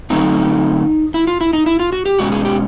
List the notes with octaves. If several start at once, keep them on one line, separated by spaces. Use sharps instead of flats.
D3 F#3 A3 C4 D#4
E4
F4
E4
D#4
E4
F4
F#4
G4
B2 G#3 C#4 F#4
G#4
G4